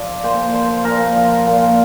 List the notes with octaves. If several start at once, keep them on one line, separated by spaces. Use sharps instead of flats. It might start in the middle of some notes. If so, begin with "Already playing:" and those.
Already playing: F3 D5
A#2 C5
F3 C5
A#2 A#4
F3
A#2